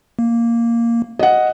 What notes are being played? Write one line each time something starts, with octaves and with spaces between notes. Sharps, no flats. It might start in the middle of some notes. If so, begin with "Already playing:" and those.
A#3
D#5 F#5